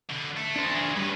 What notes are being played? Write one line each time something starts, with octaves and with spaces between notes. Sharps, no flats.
B2 D3
A3
D4 C5
F#3 G#4
G2 C#4 B4